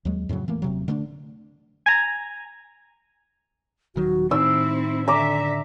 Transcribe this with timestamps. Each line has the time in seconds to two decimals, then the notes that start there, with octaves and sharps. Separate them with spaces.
0.05 D#2 F#3 G#3
0.29 F2 A2 C#3 F#3
0.48 E3 A3 A#3
0.62 D#1 C3 F#3
0.88 D3 A3 A#3 D4
1.86 G#5 A#5
3.96 D#1 D#3 F#3 F#4
4.31 A2 D#3 C4 D#4 E4 E6
5.08 D3 D5 E5 A#5 D6